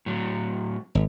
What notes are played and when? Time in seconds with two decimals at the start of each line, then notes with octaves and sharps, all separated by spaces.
0.06 A2 F#3
0.95 G#1